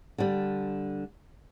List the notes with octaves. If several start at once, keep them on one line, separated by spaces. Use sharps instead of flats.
D3 G3